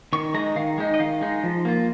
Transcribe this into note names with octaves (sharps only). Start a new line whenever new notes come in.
D#3 C#6
G#3 D#4 A#5
D#3 F5
G#3 D#4
D#5
D#3 F5
G#3 D#4
F3
A#3 F4